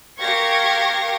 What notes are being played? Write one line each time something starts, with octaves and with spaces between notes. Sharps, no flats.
G4 A#4 F5 C#6 G#6 A#6